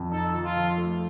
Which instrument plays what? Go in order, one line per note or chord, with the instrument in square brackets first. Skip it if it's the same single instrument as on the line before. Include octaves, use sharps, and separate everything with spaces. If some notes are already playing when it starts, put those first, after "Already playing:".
Already playing: [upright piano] F2
[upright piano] D#4 [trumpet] A4
[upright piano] F3
[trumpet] F4
[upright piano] F3
A3